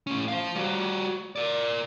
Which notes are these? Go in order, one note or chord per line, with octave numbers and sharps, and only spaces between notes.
A2 C#4
C5 F5
G3 F#4
A#4 D5